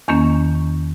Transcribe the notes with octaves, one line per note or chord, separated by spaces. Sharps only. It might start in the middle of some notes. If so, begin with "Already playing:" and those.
E2 D#3 A#3 C#4 C#6